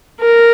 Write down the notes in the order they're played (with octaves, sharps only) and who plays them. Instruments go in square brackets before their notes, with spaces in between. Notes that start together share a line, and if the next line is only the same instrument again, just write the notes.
[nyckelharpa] A#4